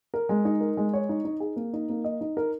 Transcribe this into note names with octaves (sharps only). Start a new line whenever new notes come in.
A#4
G#3
D#4
A#4
G#3
C#5
D#4
D#4
G#4
A#3
D#4
A#3
D#5
D#4
A#4